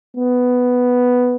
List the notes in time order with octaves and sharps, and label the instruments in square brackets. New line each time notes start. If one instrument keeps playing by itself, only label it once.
[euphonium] B3